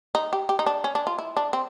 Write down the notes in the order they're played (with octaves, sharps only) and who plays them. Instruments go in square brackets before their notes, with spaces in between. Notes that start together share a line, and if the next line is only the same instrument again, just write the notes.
[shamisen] D#4
G4
G4
D#4
D4
C#4
D4
F4
E4
D4
C4